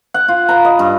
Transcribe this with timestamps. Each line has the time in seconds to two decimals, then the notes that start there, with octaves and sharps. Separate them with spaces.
0.14 F#5
0.28 F4
0.49 A#5 B5
0.65 D#5
0.79 G2